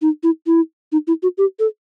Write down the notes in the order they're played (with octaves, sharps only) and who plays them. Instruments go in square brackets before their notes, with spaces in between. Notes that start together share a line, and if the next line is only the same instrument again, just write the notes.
[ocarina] D#4
E4
E4
D#4
E4
F#4
G4
A4